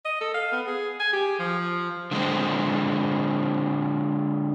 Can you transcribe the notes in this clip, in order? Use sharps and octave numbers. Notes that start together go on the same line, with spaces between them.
D#5
A4
F5
B3
G#4
G#5
G4
F3
D3 G#3 C4